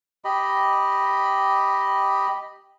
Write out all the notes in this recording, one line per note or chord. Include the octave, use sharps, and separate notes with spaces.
G4 D#5 B5